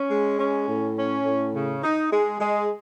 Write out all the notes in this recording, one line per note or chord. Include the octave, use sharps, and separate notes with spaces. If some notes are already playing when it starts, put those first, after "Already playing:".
Already playing: C#4
G#3
C#4
A2
C#4
A2
C#3
D#4
G#3
G#3